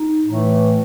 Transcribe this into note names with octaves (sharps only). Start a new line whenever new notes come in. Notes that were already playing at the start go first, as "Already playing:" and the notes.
Already playing: D#4
A2 E3 A3